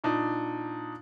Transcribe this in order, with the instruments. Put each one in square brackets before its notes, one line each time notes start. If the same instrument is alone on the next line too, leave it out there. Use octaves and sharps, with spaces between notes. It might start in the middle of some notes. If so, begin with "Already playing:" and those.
[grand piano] A#2 D4 D#4